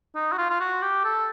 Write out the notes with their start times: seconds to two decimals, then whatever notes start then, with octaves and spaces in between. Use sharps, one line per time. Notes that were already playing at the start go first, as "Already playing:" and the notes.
0.15 D#4
0.32 F#4
0.38 F4
0.50 F4
0.60 F#4
0.82 G4
1.05 A4